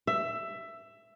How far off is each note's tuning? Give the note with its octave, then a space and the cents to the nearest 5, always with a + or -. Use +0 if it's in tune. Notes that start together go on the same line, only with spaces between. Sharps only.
E5 +15